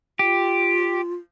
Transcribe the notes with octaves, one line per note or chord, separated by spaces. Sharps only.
F4 G4